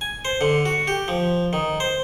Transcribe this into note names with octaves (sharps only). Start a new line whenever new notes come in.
G#5
C5
D3
F#4
G4
F3
D#3
C5